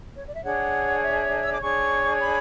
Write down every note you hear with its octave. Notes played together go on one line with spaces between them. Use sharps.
C#5
D5
E5
D4 G#4 C#5 F#5
E5
E6
D6
D4 G#4 C#5 C#6
B5